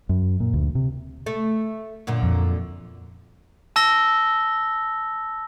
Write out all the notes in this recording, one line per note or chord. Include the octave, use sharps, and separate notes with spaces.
F#2
A#2
D2
C3
A3 A4
F#2 A#2 D3
F2
A5 E6 A#6 G7